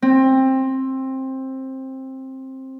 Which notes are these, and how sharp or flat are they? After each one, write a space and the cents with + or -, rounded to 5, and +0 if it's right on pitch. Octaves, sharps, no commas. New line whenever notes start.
C4 +15